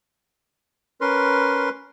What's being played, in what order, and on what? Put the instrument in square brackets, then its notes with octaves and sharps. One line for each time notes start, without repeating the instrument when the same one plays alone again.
[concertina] C#4 A#4 B4 C6